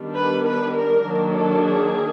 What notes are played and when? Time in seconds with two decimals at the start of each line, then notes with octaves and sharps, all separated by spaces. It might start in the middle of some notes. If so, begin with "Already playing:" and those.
Already playing: D#3 G3 B3 D4
0.14 B4
0.45 B4
0.74 A#4
1.04 D#3 F#3 A#3 D4
1.35 A4
1.64 G#4